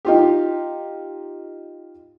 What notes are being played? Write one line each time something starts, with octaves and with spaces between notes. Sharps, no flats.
D#4 F4 G4